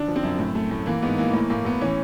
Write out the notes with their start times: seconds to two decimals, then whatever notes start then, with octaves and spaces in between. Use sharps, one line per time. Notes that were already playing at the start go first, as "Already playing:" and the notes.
Already playing: D3 D4
0.08 F3
0.16 C4
0.24 F#2
0.39 A2
0.55 A3
0.71 A2
0.86 E3 A#3
1.02 G#2 B3
1.18 E3 A#3
1.33 A2 A#3
1.50 A2 A#3
1.65 A2 B3
1.81 E3 C#4